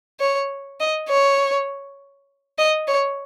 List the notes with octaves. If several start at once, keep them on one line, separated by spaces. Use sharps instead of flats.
C#5
D#5
C#5
D#5
C#5